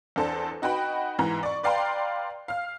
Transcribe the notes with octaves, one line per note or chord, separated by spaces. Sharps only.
E2 D4 A4 C5 A5
D#4 F#4 B4 G5 B5
G#2 E3 A#5
D5 C#6
B4 D5 F5 G5 A#5 C6
F5 F6